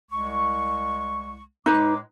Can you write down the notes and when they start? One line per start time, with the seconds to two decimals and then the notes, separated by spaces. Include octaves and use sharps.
0.10 C2 G#3 C#6
1.66 A2 G#3 D#4 B4 D6